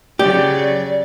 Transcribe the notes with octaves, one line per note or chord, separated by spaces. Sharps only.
C#3 F#3 G4 D5